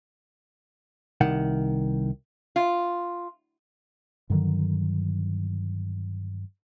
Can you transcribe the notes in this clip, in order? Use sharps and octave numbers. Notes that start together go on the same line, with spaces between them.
C2 D#3 F#5
F4
G2 D3 D#3 F#3